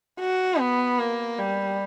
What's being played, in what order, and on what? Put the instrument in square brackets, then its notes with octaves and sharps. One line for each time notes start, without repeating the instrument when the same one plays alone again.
[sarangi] F#4
B3
A#3
G3